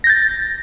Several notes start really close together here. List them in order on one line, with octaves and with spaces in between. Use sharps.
A#6 G6 A6